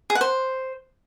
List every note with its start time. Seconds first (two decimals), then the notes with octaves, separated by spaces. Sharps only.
0.10 G#4
0.15 F#5
0.21 C5